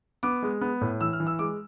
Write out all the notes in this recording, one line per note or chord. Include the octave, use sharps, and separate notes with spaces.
B3 D6
G#3
B3
A2
E3 E6
F6
E3
E6
G#3 D6